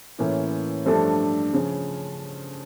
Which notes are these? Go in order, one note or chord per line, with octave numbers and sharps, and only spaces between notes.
A2 E3 A#3 C#4 E4
G2 F3 A3 D4 A4
C#3 F3 C#4